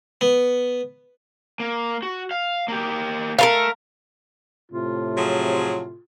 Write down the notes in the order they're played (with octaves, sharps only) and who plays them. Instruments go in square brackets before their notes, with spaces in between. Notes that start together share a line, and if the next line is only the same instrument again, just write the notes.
[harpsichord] B3
[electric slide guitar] A#3
F#4
F5
A#3 G4
[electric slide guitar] A3 [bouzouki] A#4 B4 F5
[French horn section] A2 C3 [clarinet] F4
[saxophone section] F3 F#3 G#4